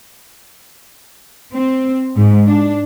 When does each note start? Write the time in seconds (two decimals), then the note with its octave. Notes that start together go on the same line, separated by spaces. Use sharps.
1.53 C4
2.16 G#2
2.48 D4